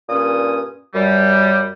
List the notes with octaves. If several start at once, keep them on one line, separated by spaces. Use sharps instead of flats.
G2 A#2 C#4 D#6
F#2 G3